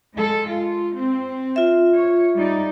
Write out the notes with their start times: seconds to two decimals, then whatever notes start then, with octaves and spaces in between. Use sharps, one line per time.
0.14 G#3 A4
0.48 F4
0.96 C4
1.56 F4 E5
1.93 C#5
2.35 G3 D#4 D5